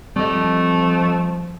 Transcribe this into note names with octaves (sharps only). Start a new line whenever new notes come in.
F3 G3 A3 C4 D#5